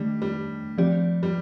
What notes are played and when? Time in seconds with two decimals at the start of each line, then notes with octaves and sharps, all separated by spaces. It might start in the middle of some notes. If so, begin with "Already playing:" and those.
Already playing: D#3 G3 A3 D4
0.22 G3
0.78 F3 C4 G4 D5
1.23 G3